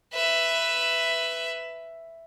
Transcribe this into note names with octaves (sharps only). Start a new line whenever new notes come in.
B4 E5